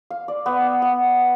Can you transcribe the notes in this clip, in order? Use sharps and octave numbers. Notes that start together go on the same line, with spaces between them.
F5
D5
B3
F#5